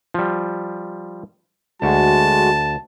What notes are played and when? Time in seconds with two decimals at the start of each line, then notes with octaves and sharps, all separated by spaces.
0.14 F3 G3
1.82 D2 G#3 F#4 A5